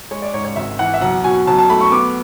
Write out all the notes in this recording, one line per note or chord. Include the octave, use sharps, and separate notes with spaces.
G#3 C#5
D5
G#2 C#5
C#5
G#1 E5
E3 F#5
E5
B1 F#5
B2 G#5
B1 A5
A5
A3 B5
C#6
B3 D6